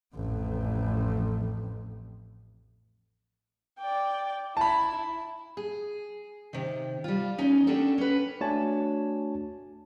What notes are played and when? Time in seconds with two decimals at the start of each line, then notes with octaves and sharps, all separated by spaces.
0.15 A1 F2
3.79 D5 G5
4.57 E4 A5 B5
5.57 G#4
6.53 C3 D#3
7.04 G3 F4
7.38 E2 C#4 D#4 G#5
7.67 C#4 D4 F#4 G4 A4
7.98 C#4 B4
8.41 A3 D4 F#4 C#5 G#5 A5